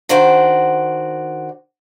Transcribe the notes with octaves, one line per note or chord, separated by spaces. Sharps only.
D#3 D4 F#4 C5